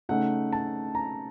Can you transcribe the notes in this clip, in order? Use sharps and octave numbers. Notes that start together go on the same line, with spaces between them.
C#3 A3 D#4 F#5
A5
A#5